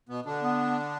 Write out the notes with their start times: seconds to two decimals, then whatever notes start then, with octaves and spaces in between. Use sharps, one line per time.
0.09 B2 B3
0.25 D3 D4
0.42 B3